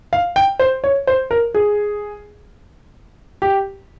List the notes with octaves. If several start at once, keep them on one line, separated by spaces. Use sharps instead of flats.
F5
G5
C5
C#5
C5
A#4
G#4
G4